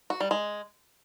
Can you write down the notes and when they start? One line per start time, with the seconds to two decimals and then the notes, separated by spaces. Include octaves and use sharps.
0.10 F#4
0.20 G3
0.31 G#3